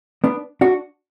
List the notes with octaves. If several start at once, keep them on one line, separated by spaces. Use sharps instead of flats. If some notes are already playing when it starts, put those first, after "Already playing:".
B3 D4
D4 F#4